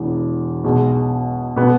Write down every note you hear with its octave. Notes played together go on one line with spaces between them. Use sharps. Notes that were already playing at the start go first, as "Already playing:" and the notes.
Already playing: E1 E2 E3
B1 B2 G#3
B2 B3